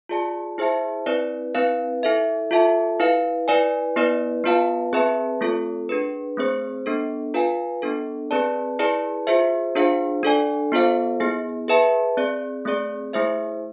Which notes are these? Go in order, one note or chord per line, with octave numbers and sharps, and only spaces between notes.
F4 G#4 D5 A5
E4 G#4 C5 E5 A5
C4 E4 B4 D5
C4 E4 B4 F5
E4 A4 E5
F4 A4 E5 A5
E4 B4 F5
E4 B4 D5 G#5
B3 E4 B4 D5
B3 F4 B4 F5 A5
C4 G#4 B4 E5 A5
A3 C4 F4 A4
D4 G#4 B4
A3 C4 G#4 C5
B3 D4 A4
F4 B4 F5 G#5
B3 D4 A4
C4 G#4 B4 D5 A5
E4 G#4 B4 D5 A5
F4 G#4 C5 E5
D4 F4 G#4 C5 F5
D4 A4 D5 G#5
B3 F4 A4 C5 F5
B3 E4 G#4
G#4 B4 E5 A5
C4 G#4 D5
A3 C4 G#4 D5
A3 E4 G#4 C5 E5